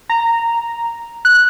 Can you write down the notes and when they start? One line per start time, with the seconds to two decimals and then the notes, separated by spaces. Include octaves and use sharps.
0.09 A#5
1.25 F#6